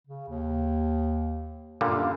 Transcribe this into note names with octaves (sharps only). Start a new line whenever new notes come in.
C#3
D#2
F#2 A#2 D3 G3 F5